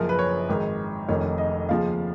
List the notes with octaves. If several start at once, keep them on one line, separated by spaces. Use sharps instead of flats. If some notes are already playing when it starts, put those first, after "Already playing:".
Already playing: F#1 F#2 F3 A#4
B4
C#5
G#1 G#2 D#3
F1 F2 D#3 C#5
D#5
D#2 C#3 F3 F5